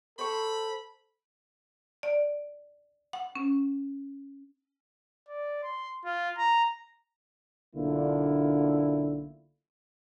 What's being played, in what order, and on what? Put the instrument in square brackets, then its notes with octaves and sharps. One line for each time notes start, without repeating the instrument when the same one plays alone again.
[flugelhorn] A4 [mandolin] C5 C#6 [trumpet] B5
[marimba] D5
F#5
C#4
[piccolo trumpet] D5
C6
F4
A#5
[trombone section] B1 D3 A#3 D4 E4 F4